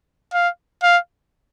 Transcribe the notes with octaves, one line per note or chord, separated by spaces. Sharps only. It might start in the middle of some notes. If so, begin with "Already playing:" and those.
F5
F5